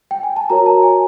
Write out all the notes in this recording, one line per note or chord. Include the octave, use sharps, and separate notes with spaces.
G5
G#5
A5
F#4 A#4 C#5 A#5
A5
G#5